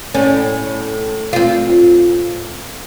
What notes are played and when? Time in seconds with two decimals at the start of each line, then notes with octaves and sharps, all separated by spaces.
0.15 A2 C#4
1.33 C4 F4